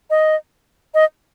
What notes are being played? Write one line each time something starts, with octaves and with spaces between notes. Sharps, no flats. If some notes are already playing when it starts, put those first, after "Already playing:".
D#5
D#5